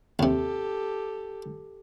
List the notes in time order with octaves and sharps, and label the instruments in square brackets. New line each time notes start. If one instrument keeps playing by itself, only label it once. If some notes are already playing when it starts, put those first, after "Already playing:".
[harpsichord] D#2 C3 [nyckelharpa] G4 A4